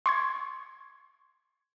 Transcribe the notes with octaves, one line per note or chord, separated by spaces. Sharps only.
C6 C#6 G#6